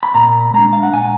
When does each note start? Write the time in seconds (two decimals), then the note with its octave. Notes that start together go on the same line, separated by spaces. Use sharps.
0.03 B5
0.14 A#2 A#5
0.54 G#3 D4 A#5
0.73 F5
0.83 F#5
0.93 A#2 G#5